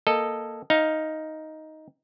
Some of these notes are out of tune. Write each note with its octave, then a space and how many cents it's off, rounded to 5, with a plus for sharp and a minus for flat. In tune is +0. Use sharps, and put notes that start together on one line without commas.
A#3 +0 A4 +0 D#5 -5
D#4 +5 F5 +0